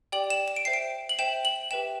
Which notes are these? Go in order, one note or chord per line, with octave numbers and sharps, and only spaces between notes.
G4 D5 G5 F#7
E7
E7
D7
C5 E5 G5 C7
D7
F#7
C5 E5 G5 E7
F#7
G4 B4 E5 G5 E7